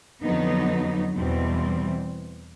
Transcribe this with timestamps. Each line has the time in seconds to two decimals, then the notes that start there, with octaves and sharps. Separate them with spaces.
0.24 F2 D3 F#3 B3 D#4
1.15 E2 B2 G3 C4